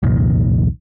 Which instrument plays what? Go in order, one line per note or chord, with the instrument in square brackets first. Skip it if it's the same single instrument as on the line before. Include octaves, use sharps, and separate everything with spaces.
[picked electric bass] C2 F2 A#2 D#3